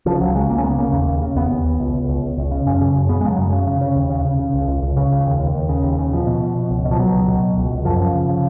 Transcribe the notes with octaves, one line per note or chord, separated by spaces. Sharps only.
C#3 F3
C#2 F#3
C#3 G#3
C#2 A#3
C#4
C#3 B3
C#3 A#3
D#2
D#2
C#3
D#2 B3
D#2
D#2
C#2
C#2
C#2
C#2
C#2
C#3
F#2 C#4
C#3
F#2
C#3 B3
G#3
C#3 F3
F#3
F#2
C#3
C#3
C#3
D#2
C#3
C#3
C#3
C#2
C#2
C#2
C#3
C#2
D#2
D#2
D#2
C#3
D#2
C#3
B2 F3
B2
B2
B2
C#2
B2
F3
B2 F#3
C#2
B2
B2
C#2
C#2
F#2 F3
C#3
C#3
C#3